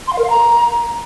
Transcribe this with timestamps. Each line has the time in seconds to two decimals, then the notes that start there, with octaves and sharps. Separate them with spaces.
0.07 C6
0.13 F5
0.18 A#4
0.24 F5
0.30 A#5